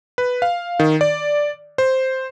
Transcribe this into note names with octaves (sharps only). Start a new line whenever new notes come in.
B4
F5
D#3
D5
C5